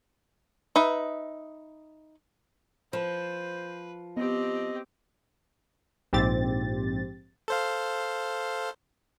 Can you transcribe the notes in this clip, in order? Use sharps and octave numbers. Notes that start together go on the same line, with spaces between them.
D#4 B4 E5
F3 B4 C5
B3 C4 G4 D#5
A#1 G#2 C4 G4 A6
A4 C5 F5